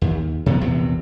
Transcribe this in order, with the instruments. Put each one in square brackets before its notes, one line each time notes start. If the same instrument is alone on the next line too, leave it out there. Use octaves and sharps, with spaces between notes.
[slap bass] D#2
C3 F#3 B3
A#1 E2 C3